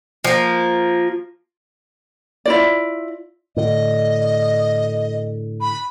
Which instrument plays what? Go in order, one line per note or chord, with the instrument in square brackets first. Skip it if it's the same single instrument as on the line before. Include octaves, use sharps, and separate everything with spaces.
[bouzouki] F3 A#3
[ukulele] E4 F4 D5
[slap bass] A2 D3 [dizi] D#5
[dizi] B5